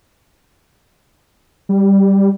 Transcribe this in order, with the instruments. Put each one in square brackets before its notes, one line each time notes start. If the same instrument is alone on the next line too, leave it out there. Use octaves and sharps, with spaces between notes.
[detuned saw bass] G3